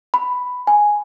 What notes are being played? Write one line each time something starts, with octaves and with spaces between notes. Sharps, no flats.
B5
G#5